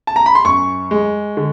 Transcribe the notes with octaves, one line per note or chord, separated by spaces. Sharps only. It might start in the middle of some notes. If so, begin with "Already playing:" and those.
A5
A#5
B5
C6
F#2 C#6
G#3
D3